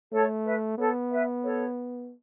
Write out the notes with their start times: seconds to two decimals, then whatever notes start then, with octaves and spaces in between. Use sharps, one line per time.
0.12 A3 A4 C#5
0.45 B4 E5
0.78 B3 A4 C#5
1.11 B4 E5
1.44 A4 C#5